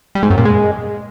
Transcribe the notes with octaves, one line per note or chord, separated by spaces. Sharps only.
G3
G#2
F#2
A#2
G#3